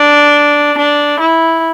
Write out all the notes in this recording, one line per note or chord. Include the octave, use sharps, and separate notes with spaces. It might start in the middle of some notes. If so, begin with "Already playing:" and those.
Already playing: D4
D4
E4